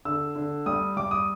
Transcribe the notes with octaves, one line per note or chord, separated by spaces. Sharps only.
D3 E6
D3
G3 D#6
G3 D6
D#6